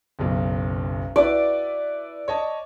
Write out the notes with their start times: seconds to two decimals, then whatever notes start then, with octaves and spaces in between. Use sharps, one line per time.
0.19 F#1 B1
1.16 E4 F#4 B4 D5
2.28 C#5 D#5 A5